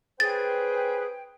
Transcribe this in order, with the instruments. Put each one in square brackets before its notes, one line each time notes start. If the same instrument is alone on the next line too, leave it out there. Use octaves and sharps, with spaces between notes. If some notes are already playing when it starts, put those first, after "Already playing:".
[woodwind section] C#4 C5 G5 [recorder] G#4 [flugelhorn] B4 [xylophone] A6